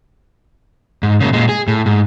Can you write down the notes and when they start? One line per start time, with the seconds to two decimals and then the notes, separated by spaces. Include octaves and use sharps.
1.03 G#2
1.20 C#3 A#3
1.33 A#2 G#3
1.49 G#4
1.68 A2
1.86 G#2